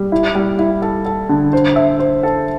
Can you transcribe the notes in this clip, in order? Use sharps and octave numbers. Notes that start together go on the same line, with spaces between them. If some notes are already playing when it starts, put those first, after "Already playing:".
Already playing: G3
E4
G3
E4
A4
A4
D3
C5
E5
C5
A4